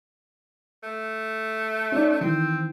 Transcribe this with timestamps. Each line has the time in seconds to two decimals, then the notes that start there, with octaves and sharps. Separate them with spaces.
0.83 A3
1.92 C#4 D#4 D5
2.21 D#3 E3 C4